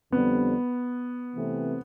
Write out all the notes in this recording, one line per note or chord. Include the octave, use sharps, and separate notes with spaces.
F2 D3 G3 B3 C4
C3 E3 A3 C4